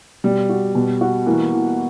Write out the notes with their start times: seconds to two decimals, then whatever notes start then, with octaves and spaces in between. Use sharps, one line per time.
0.24 B2 G3
0.49 F#4
0.75 B2
1.01 F#4
1.26 E3 A#3
1.52 E3